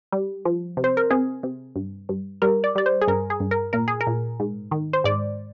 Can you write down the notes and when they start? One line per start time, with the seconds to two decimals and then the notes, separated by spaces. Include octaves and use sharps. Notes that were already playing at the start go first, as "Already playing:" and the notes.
0.12 G3
0.45 F3
0.77 C3
0.84 C5
0.97 A#4
1.10 C3 G#4
1.43 C3
1.76 G2
2.09 G2
2.42 G3 A#4
2.64 D5
2.75 G3 D5
2.86 C5
3.01 G#4
3.08 G2 A#4
3.30 G#4
3.40 G2
3.51 A#4
3.73 A#2 A#4
3.88 G#4
4.01 A#4
4.07 A#2
4.40 G#2
4.71 D#3
4.93 C5
5.04 G#2 D5